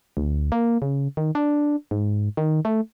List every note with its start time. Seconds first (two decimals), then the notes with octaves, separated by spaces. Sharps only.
0.17 D2
0.52 A#3
0.82 C#3
1.17 D#3
1.35 D4
1.91 G#2
2.37 D#3
2.65 A3